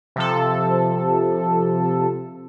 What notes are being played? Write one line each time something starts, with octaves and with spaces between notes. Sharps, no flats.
C3 F3 A4